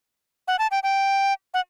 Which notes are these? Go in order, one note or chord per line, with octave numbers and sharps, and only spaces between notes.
F#5
A5
G5
G5
F#5